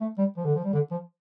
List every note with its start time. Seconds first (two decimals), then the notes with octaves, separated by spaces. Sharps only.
0.01 A3
0.18 G3
0.37 F3
0.45 D3
0.55 F3
0.64 G3
0.73 D3
0.91 F3